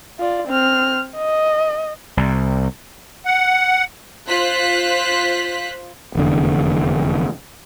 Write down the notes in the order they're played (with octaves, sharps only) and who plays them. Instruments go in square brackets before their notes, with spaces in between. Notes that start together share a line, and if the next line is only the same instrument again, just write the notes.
[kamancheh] F4 D5
C4 F6
D#5
[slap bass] C2
[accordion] F#5
[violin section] F4 C5 F#6 B6
[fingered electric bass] F1 E2 D3